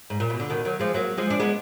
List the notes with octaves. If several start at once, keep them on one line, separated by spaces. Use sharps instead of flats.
G#2
A#2
B2
D3
B2 D#3
D#3 F#3
F3 G#3
F#3 A#3
F3 G#3
D4
G#3 B3